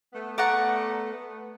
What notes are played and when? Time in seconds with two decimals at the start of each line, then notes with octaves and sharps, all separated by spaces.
0.13 A3 B3
0.38 A3 B3 D5 F#5 A#5 C#6
1.12 A3 B3